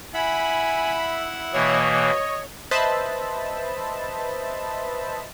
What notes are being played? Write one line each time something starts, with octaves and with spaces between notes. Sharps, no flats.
E4 E5 F#5 G#5 B5
B2 E3 A#3 C#5 D#5
B4 C5 D#5 E5 A5 B5